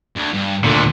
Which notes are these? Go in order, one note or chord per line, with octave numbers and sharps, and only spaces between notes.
D2
G2
D2 A#2 D3